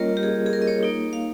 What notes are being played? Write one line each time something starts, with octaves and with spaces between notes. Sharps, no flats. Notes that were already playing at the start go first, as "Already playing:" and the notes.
Already playing: G3 A#3 C#4 F4 A#4 C#5 D#5
G4
G#4
G#4
A#4
D#5
C#5
A#3 D#4
F5